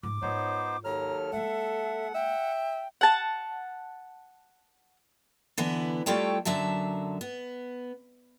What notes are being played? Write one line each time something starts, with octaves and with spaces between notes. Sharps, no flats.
G#2 D6
G#2 B3 D#4 F4 C5 C#5
D#2 F#3 A4 A#5 F6
G#3 A#3 E5 F#5
E5 G5
F#5 A5
D3 E3 B3 E4
G3 A3 F4 A4 C#5 G5
F#2 D3 F#3 E5 A5
B3